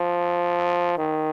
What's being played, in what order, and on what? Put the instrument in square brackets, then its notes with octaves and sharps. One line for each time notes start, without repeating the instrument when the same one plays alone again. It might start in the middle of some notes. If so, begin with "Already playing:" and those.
Already playing: [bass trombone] F3
D#3